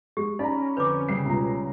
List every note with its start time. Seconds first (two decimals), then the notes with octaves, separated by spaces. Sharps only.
0.17 G#3 G4
0.39 C#4 D#4 D5 A#5 B5
0.77 F2 D3 B4 D6 G6
1.09 C#3 G3 C7
1.26 C#2 B2 A#5